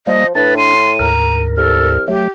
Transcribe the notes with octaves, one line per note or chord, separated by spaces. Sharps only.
F3 G3 A#3 D#5
A2 D4 B4 A6
C6 D#7
D2 G#2 A#4 A#5
C2 A4 F6
F#3 A3 G4